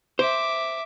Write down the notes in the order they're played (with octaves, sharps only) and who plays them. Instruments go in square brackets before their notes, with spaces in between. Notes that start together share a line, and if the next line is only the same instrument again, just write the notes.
[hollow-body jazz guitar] C5 [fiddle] E5 D6